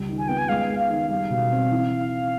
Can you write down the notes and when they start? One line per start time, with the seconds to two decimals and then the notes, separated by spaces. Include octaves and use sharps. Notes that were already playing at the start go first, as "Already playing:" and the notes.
Already playing: C#2 G3
0.09 D#3
0.18 G#5
0.28 B3 G5
0.38 G#5
0.49 G#3 F5
0.70 G#3
0.80 F5
0.90 D#3
1.10 G3 F5
1.30 B2
1.51 C4
1.71 E3